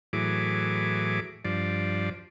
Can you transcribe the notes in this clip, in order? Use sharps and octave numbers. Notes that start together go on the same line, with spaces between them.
A2 E3 F#3 G#4 D6
G2 F3 D5